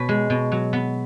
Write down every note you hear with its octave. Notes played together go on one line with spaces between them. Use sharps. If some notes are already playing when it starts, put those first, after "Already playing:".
Already playing: B2 C#4 B4
G#3
B2
F#3
B3